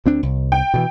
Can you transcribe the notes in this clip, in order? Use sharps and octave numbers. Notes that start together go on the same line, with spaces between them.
D2 C4 D4
C2
G5
B2 D3 E3